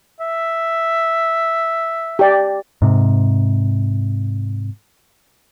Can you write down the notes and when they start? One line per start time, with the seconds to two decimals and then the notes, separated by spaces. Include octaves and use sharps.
0.20 E5
2.19 G4 D5
2.82 G#2 C3